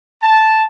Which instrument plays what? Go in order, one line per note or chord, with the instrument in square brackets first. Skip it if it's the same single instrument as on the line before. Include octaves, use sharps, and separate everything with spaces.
[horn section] A5